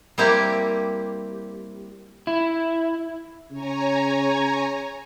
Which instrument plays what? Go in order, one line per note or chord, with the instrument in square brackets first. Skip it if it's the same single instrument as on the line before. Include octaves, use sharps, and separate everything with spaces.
[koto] G3 A#3 C4 E4 G4
[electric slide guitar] E4
[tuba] C#3 [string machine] C#5 G#5 A#5